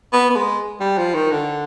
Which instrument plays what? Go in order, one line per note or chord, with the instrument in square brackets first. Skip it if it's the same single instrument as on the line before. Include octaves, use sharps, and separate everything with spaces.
[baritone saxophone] B3
B3
G#3
G3
F3
D#3
D3